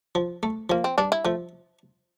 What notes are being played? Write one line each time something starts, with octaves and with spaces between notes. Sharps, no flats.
F3
A3
F3 A#3
C4
G2 D4
E4
F3 A3